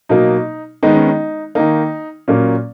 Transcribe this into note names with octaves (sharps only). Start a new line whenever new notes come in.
B2 F#3 A#3 D#4
D#3 G#3 B3 D#4
C#4
D#4
D#3 A#3 D#4
A#2 F#3 A#3 C#4